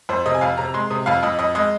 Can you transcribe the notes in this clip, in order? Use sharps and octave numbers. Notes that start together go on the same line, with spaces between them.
F2 C5
C3 D#5
G#5
F2 F5
C3 A#5
G#3 C6
C3 D#6
F2 F5
F2 D#5
F2 D#5
G#3 D#5